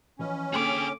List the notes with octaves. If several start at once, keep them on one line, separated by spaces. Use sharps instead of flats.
E3 F3 C#4 D#5
D3 A#3 G#4 A4 G5 D6